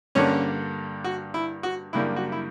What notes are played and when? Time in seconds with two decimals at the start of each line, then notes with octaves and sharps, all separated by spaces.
0.15 G2 D3 A#3 C#4 D4 C#5
1.04 F#4
1.34 E4
1.63 F#4
1.93 F#2 C#3 G3 A#3 D4 E4
2.16 F#4
2.32 E4